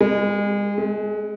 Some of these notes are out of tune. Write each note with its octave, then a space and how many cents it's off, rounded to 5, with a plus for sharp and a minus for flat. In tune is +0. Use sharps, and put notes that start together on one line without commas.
G#3 -35
G#3 +25